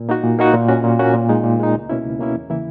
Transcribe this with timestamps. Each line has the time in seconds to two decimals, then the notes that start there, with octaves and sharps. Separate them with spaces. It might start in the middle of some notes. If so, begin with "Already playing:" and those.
Already playing: A#2
0.09 A#3 D#4 F#4
0.24 A#2
0.39 A#3 D#4 F#4
0.53 A#2
0.69 A#3 C#4 F#4
0.84 A#2
0.99 A#3 C#4 F#4
1.14 A#2
1.29 G#3 D#4
1.44 A#2
1.59 G#3 D#4
1.74 C#2
1.89 B2 A#3 C#4 E4
2.05 C#2
2.20 B2 A#3 C#4 E4
2.35 E2
2.50 C#3 E3 A#3 E4